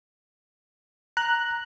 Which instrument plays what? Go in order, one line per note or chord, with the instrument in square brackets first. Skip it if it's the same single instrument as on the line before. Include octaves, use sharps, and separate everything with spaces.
[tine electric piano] A#5 [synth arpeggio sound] F#6